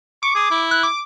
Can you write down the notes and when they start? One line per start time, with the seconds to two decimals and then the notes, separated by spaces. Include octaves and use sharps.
0.23 C#6 D6
0.35 G#4
0.50 E4
0.71 F#6
0.83 D6